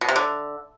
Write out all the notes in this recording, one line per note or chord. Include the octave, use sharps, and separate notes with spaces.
B2
C3
D3